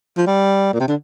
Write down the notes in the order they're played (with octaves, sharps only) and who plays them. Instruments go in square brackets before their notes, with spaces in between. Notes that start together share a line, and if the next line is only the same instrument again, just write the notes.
[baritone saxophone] F3
G3
A#2
C3
D3